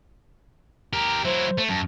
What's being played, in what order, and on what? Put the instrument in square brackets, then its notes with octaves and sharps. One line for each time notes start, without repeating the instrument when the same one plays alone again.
[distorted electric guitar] G4 A#4 [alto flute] A#5
[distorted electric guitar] F#3 E4 [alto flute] C5
[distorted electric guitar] A3
[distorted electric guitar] F#2 [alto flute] A5